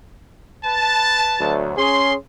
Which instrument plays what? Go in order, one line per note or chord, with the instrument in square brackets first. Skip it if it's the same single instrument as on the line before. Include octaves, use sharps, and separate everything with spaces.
[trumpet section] B4 A5
[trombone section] D2 F#3
[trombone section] C#4 G#4 [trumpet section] C6